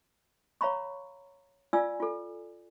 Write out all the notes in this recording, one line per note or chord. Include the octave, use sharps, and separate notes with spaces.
C#5 F5 A#5 B5 C#6
F4 D5 F5 G#5 E6
F4 A4